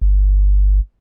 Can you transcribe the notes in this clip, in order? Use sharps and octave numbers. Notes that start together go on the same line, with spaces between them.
G1